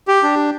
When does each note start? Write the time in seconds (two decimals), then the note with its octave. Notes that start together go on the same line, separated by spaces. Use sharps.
0.08 G4
0.23 D4